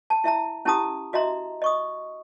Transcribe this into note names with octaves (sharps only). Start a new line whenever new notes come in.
A5
E4 E5 A5 A#5
C#4 E4 G4 A5 A#5 D#6
F#4 D#5 E5 A#5 C6
D#5 C#6 D#6